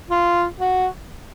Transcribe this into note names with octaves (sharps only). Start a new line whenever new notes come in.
F4
F#4